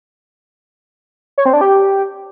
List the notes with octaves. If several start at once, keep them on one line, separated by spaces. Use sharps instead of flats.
C#5
C4
D4
G4